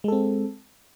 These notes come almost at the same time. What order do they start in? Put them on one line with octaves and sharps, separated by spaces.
G#3 A4 C4